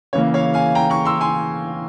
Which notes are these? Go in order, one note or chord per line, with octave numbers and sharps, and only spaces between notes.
C#3 E3 A#3 C#5
C#5 F5
F5 G#5
G5 A#5
A#5 C#6
C6 E6
G#5 C6